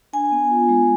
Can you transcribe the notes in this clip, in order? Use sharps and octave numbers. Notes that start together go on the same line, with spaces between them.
D4 G#5
B3
F4
G#3